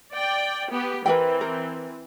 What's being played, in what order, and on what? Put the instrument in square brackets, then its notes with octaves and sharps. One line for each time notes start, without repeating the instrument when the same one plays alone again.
[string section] D5 G5
B3 G4
[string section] E3 C4 [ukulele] A#4 B4 G5
[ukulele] A#4